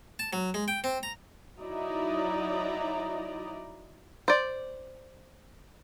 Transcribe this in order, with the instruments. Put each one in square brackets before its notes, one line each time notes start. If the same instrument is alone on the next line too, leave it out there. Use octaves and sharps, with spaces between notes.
[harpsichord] A5
F#3
G#3
G5
C4
A#5
[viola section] F#3 D#4 E4 D5 D#5 A#5
[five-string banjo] C5 D5